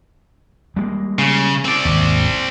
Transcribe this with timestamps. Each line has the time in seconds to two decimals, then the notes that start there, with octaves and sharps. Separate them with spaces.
0.76 G3 G#3 A#3
1.19 C#3
1.65 C4 D5
1.85 G#1 D#2